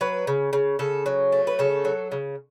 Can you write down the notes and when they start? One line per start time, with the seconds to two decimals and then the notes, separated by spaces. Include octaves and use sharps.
0.01 F#3 B4
0.27 C#3
0.53 C#3
0.79 C#3 A4
1.06 F#3
1.32 A3
1.47 B4
1.59 C#3 A4
1.85 F#3
2.12 C#3